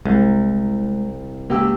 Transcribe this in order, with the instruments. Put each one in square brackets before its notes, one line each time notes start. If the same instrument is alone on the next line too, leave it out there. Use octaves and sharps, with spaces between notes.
[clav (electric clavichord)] C2 [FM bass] G#3
[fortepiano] C#2 G4 E6 [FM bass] A#3